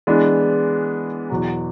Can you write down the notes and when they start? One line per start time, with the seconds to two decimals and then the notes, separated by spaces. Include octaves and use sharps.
0.07 E3 G#3 B3 D4
1.30 E2 B2 F#3